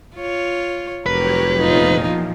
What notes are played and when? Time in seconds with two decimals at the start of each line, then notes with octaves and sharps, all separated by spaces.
0.15 F4 C#5
1.06 F1 F#3 G4 A#4 B4 C#5
1.59 E2 A#2 F3 D#4 F4